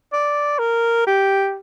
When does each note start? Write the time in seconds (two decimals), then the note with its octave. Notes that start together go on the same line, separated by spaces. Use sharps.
0.13 D5
0.58 A#4
1.07 G4